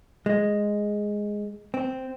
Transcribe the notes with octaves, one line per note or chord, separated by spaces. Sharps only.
G#3
C4